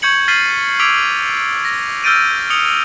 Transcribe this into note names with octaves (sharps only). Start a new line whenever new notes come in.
C#6 G6 G#6 C#7 F#7
F6 A6 B6 C7 D#7 F#7
D6 E6 G#6 B6 D7 F7
A#6
E6 F6 G6 A6 D7 D#7
D#6 C#7 F7 G7